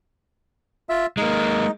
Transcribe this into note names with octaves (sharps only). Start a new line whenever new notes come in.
F4 E5 E6
G#3 A#3 D#4 D#5